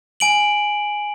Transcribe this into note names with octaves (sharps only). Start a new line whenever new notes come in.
G#5 D7 F#7